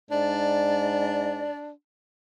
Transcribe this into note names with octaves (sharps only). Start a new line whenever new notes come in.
G#2 D4 D5